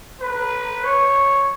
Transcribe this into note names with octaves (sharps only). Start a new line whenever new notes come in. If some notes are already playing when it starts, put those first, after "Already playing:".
B4
C#5